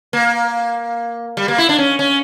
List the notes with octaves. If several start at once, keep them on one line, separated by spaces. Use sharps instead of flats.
A#3
G3
A#3
E4
D4
C#4
C#4